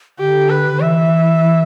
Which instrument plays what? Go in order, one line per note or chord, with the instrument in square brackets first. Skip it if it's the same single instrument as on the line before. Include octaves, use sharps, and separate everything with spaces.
[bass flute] D3 [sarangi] G4
[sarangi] B4
[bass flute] D3
[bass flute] E3 [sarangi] E5